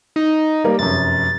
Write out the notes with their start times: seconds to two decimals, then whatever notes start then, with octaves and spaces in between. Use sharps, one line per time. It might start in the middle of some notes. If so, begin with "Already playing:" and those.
0.16 D#4
0.64 G3 A#3 A#4
0.79 F1 F#2 A6